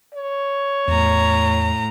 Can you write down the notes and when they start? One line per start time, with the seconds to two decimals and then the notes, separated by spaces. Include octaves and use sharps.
0.14 C#5
0.88 E2 A2 A#5